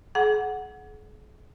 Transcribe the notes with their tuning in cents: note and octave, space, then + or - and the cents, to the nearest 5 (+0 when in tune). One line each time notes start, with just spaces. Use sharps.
G#4 +40 F#5 +0